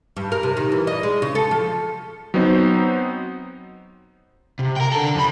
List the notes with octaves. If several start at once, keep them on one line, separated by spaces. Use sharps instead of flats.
G2
A#4
C3
D#3
E3
D#5
G#3
C#3
A4
F3
F#3 B3 C4 D#4 C5
C3
A#4 G5
D3 A4
F2 B5